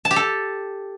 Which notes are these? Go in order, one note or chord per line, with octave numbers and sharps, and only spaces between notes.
A5
G4
A4